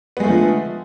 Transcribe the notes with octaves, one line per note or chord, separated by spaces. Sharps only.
D3 F3 G#3 A3 B3